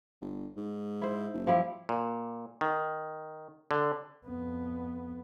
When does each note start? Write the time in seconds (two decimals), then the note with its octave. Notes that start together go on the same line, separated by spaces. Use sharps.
0.21 G1
0.57 G#2
1.02 E4 C5
1.34 F#1
1.47 F3 G3 E4
1.89 A#2
2.61 D#3
3.71 D3
4.26 F2 B3